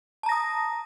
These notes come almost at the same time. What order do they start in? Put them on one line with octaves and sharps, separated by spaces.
A5 A#5 A#6 D#6